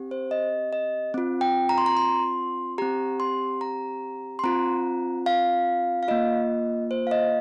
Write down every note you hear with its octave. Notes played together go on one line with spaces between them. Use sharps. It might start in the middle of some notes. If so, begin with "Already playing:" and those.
Already playing: C4 G4
C5
D#5
D#5
C4 F4
G5
A#5
C6
A#5
C6
C4 G4 A#5
C6
A#5
C6
C4 F4 A#5
F5
F5
A#3 F4 D#5
C5
F5
D#5